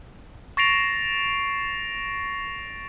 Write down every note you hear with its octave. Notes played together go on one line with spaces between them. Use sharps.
C#6 A6 A#6 C7 D7 F7